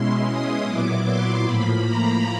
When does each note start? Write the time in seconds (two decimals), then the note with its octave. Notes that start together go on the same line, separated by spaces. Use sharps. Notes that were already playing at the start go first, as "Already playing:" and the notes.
Already playing: B2 G#3 C#4 E4 C6
0.27 D#6
0.66 A#2 F#3 B3 E4 D6
1.05 C6
1.44 A2 F3 A#3 B5
1.84 A#5